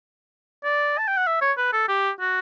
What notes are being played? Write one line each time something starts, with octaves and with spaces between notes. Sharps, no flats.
D5
A5
G5
F#5
E5
C#5
B4
A4
G4
F#4